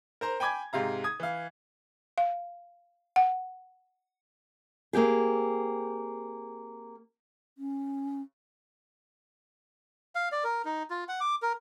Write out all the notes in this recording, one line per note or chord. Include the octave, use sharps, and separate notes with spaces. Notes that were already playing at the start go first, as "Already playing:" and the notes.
A#4 C5 A#5
G5 G#5 B5 D6 G#6
G#2 C3 F5 A#5
D#6 G#6
E3 F5
F5
F#5
A#3 C4 G4 G#4
C#4
F5
D5
A#4
D#4
F4
F#5
D6
A#4